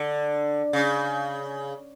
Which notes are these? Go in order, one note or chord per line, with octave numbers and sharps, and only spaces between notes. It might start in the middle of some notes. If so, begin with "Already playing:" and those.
Already playing: D3
C#3